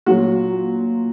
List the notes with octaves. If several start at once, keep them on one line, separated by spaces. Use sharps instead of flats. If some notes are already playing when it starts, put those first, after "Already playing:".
A#2 F#3 F#4